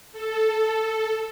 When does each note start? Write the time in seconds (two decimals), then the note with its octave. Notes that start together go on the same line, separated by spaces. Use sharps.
0.13 A4